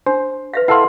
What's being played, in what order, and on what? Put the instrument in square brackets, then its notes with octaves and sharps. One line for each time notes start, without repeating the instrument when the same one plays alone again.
[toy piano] D4 [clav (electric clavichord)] C5
[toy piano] B4 E5 F5
[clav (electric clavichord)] E4 A4 F5 [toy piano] F#5 C6